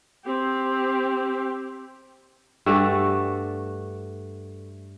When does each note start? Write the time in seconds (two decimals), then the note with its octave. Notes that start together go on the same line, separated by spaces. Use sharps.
0.25 C4 G4
2.66 G2 A3 F#4 D5